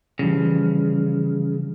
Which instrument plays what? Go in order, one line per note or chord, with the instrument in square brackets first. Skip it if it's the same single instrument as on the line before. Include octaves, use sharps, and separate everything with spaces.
[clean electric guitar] C#3 [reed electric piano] E3 F3 G3